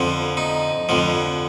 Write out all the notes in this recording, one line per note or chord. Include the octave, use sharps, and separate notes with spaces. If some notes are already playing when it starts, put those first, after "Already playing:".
Already playing: F2 D3 F3
D#4
F2 D3 F3